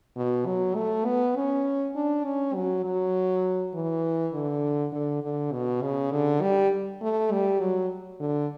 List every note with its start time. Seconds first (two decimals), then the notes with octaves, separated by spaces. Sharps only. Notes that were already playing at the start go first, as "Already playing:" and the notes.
0.17 B2
0.46 F#3
0.75 A3
1.05 B3
1.36 C#4
1.95 D4
2.24 C#4
2.54 F#3
2.85 F#3
3.74 E3
4.33 D3
4.93 D3
5.22 D3
5.52 B2
5.82 C#3
6.12 D3
6.42 G3
7.01 A3
7.31 G3
7.60 F#3
8.20 D3